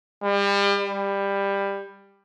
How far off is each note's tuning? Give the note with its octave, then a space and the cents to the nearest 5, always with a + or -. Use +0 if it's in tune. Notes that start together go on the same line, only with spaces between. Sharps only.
G3 +35
G3 +15